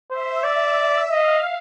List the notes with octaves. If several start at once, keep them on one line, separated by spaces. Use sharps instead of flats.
C5 E5
D5 E5
D#5 F5